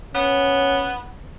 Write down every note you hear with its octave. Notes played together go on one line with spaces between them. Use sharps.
B3 C#4